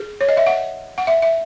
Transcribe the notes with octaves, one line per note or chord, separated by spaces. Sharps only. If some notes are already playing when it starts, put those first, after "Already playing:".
Already playing: G#4
C#5
D#5
E5
F#5
F#5
E5
E5